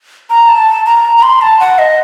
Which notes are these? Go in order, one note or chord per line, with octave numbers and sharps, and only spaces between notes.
A#5
A5
A#5
A#5
C6
A5
F#5
D#5